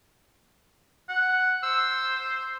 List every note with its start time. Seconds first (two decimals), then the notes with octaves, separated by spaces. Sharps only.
1.09 F#5
1.63 C5 E6